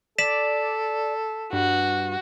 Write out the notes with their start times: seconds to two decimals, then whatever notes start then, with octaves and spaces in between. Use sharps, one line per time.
0.18 A4 D5 B6 E7
1.53 G2 F#4